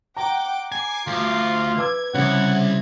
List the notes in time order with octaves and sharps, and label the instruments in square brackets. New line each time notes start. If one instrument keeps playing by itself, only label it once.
[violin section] F#5 G5 D6 [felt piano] A#5
[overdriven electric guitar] G#5 [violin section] D6 C7
[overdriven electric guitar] D2 [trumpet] F4
[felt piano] B4 D6 E6 [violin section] G#6
[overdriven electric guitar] C2 [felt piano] C#3 [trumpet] F#5